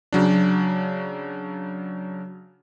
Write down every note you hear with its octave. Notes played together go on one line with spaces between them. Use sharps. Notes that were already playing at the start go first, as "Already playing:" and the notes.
C#3 F#3 D4